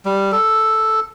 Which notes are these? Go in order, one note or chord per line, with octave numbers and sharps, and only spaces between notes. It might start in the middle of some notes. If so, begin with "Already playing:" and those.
G3
A4